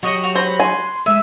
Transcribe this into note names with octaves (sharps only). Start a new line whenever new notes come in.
F#3 F#4 G4 C#5 D#5
F#4 F7
B4 C5 A#6
G#5 C6
G#3 G#4 E5 E6